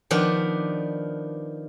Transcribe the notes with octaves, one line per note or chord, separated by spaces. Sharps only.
D#3 F3 B3 D4 B4